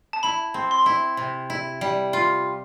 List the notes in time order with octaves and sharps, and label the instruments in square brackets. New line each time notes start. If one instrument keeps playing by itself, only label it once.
[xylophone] A5
[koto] E4 [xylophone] B5
[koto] C4
[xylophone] C6
[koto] E4
C3
E4
G3
F4